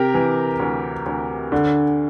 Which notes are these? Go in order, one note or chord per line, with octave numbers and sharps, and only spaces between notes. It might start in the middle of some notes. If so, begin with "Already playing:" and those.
Already playing: C3 G4 A#4
E3
D2
D2
D3